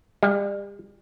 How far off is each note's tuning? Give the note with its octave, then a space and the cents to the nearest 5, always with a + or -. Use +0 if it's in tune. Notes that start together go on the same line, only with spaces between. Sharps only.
G3 +40